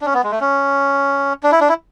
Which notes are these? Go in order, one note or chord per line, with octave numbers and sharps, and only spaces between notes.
D4
C#4
B3
G#3
A3
C#4
D4
E4
D4
E4